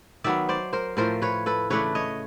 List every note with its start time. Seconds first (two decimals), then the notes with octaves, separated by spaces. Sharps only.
0.24 D#3 F#3 B3 D5 E5
0.49 C5 D5
0.73 A#4 C5
0.97 A2 F3 A3 A#4 C5
1.22 B4 C#5
1.46 A4 B4
1.70 C#3 E3 A3 D4 B4 C#5
1.95 C#5 D#5